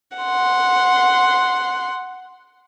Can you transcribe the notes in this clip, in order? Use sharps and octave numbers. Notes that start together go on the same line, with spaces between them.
F#5 C6